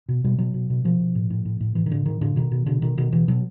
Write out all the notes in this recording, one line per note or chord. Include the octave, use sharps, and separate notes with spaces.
B2
B2 G3
B2 F#3
B2
B2
B2 F3
B2
A2
A2
A2
A2
A2 E3
D#3
A2 D3
A2 D#3
A2 D3
B2 D#3
B2
B2 D3
B2 D#3
B2 D#3
B2 E3
B2 F#3